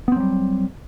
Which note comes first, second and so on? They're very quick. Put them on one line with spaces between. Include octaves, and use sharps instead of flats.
B3 C4 F#3 G3